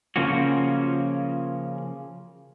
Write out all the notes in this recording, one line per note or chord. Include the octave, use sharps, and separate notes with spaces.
C#3 F3 A#3 C#4 F#4